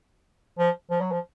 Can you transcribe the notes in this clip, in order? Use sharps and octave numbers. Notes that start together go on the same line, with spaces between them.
F3
F3
F#3
F3